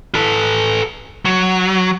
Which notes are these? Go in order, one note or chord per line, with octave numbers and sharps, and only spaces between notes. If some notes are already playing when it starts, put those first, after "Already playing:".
A4 B4
F#3